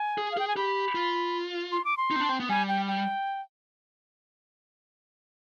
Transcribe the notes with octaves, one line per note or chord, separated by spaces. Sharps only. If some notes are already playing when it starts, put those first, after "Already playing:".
Already playing: G#5
G#4
F5
G#4 G5
G#5
G4 B5
F4
C6
D6
C6
D#4
C4
D4
C4
B3
G3 G#5
G5
G5